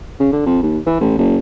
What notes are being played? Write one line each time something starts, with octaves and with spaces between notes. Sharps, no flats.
C#3
D3
F2
D#2
E3
A1
F#1